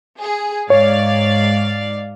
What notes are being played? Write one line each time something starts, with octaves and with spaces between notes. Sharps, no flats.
G#4
G#2 C#5 D5 F5